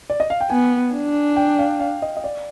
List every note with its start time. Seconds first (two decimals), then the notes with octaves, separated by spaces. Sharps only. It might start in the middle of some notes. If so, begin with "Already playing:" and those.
0.10 D5
0.20 D#5
0.30 F5
0.41 G5
0.50 B3 G#5
0.93 D4
1.36 G5
1.59 F5
1.80 F5
2.02 D#5
2.17 D#5
2.24 D5